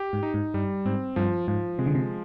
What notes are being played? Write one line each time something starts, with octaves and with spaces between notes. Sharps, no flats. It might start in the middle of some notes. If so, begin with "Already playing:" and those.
Already playing: G4
G#2
D#4
G#2
G2 G3
G#2 C4
G2 F3
G#2 F3
C3 G#3
D3
C3